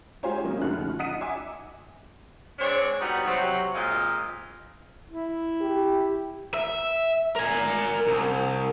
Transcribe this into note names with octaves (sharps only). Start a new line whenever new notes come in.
G#3 F4 G4 C5 C#5 G#5
C3 F#3 A#3 C#4 D#4
F#1 C#2 D3 A3 F6 F#6
F3
D#5 F#5 D#6 B6 C#7 D#7
E5 G#5 D6
G#3 C4 D4 C#5
G3 B3 D#4 F#4
C3 F#3
A#2 G#3 C4 D#5 F5
E4
G4
E5
A#4 G#5
C2